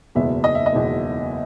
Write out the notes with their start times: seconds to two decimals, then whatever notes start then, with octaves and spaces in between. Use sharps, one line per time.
0.15 F#1 E2 B2 G#3 B3 E5
0.44 D#5
0.55 E5
0.66 D#5
0.73 F#1 E2 B2 G#3 B3